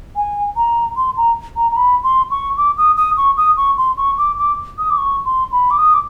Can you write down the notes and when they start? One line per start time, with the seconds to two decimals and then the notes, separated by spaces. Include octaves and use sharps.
0.16 G#5
0.56 A#5
0.97 C6
1.17 A#5
1.57 A#5
1.71 A#5
1.77 B5
2.04 C6
2.31 C#6
2.57 D6
2.78 D#6
2.97 D#6
3.17 C#6
3.37 D#6
3.57 C#6
3.78 C6
3.97 C#6
4.18 D6
4.38 D6
4.78 D#6
4.90 D6
4.98 C#6
5.25 C6
5.52 B5
5.71 D6
5.78 D#6
5.94 D6